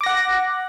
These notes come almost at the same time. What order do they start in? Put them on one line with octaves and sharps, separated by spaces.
D6 A#6 F#5 F#6